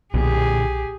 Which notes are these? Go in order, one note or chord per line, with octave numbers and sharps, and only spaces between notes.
B1 A#2 D3 E3 G4 G#4